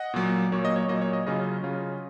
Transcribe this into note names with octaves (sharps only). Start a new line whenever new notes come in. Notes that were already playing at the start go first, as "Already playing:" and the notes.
Already playing: D#5 F#5
A#2 F#3 A#3
A#2 F#3 A#3 C#5
D#5
C#5
A#2 F#3 A#3 D#5
C#5
D#5
C#3 F#3 C#4 F4 D#5
C#3 F#3 C#4 F4